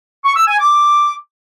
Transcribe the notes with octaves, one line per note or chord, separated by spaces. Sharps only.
C#6
E6
G#5
D6